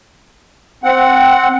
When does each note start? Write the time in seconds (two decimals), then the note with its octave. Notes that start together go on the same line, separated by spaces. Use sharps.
0.84 C4 F#5